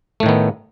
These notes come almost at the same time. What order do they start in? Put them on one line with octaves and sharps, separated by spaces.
A3 A2 D#3 B3